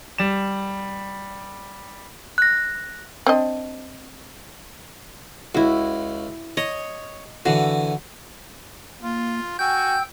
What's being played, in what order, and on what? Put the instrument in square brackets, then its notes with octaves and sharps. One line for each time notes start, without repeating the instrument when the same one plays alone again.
[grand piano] G3 E7
[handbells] F#6 A#6
[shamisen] C4 D4 D#5
[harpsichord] C#2 [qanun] E4 F#4
[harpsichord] C#5 [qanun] D#5
[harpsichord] D3 E3 [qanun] F#4
[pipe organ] A#3 [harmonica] F4
[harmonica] F#4 G#5 [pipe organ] G5 E6 [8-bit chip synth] G6